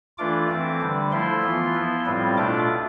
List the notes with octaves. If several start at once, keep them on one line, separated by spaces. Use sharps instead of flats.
E3 A3 D4 F4 D6
E3 A3 C4
D3 G3 D4
F3 A3 E4 C6
E3 B3 F4
F3 B3 E4
A2 G3 C4 F4
B2 A3 D4 F4 D6